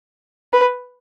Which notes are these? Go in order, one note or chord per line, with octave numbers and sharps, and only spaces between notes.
B4